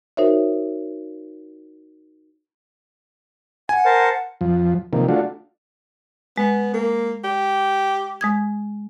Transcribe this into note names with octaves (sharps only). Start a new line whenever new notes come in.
D#4 F#4 A#4 C5 C#5 E5
F#5 G#5
A#4 C5 A5
F2 F3
C3 D#3 F3 A#3
A3 D4 F4 F#4
G#3 B3
A#3
G4
G#3 D#6 G#6